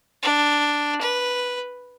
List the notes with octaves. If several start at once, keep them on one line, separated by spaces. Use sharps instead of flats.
D4
B4